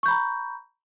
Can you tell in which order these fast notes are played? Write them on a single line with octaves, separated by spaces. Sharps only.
C#6 G6 B5 A#5